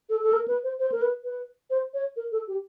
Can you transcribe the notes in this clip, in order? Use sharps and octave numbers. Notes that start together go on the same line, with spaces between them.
A4
A4
A#4
B4
C5
C5
A#4
B4
B4
C5
C#5
A#4
A4
G4